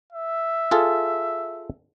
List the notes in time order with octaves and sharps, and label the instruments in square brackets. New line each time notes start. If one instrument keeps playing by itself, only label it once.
[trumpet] E5
[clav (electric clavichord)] F4 G#4 A4